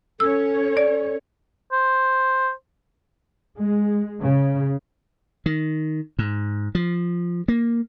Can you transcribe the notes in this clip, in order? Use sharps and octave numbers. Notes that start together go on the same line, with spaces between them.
C#4 A4 C#5 E6
D5
C5
G#3
C#3
D#3
G#2
F3
A#3